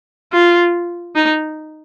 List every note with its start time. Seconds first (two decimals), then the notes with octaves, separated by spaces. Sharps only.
0.32 F4
1.16 D#4